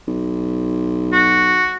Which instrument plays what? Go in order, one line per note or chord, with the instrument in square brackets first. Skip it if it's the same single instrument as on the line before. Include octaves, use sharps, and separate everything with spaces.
[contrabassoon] B1
[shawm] F#4